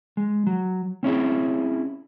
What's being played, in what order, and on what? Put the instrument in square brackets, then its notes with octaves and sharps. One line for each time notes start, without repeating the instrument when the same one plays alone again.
[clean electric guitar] G#3
F#3
C4 C#4 E4 G#4